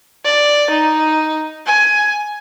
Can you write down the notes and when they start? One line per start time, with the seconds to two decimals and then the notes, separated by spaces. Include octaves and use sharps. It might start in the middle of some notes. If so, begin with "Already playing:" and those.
0.25 D5
0.70 D#4
1.66 G#5